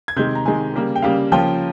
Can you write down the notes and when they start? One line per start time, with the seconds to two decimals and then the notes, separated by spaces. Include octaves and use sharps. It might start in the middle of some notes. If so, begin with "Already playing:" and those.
0.08 G#6
0.16 C3 D#3 G#3 G6
0.35 A#5
0.45 C3 D#3 G#3 G#5
0.74 C#3 G3 A#3
0.96 G5
1.02 C#3 G3 A#3 F5
1.32 C#3 F3 A#3 C#4 F4 G5